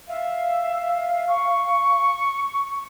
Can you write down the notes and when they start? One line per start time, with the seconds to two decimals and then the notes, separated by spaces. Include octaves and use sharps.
0.08 E5 F5
1.28 C#6